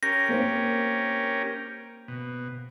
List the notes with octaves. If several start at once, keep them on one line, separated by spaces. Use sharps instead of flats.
C#4 G4 A#4 A#6
A#3 C4
B2